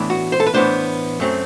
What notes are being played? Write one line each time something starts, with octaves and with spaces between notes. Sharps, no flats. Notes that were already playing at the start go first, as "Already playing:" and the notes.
Already playing: A2 E3 B3 D4
F#4
C5
A4
B4
A2 E3 B3 D4 C5
F#2 F#3 A3 C4